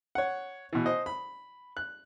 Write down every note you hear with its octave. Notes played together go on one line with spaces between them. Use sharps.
C#5 F#5
B2 E3
C5 D#5
B5
F#6